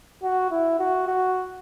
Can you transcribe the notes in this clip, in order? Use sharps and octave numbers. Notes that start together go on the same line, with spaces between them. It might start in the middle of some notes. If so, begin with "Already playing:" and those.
F#4
E4
F#4
F#4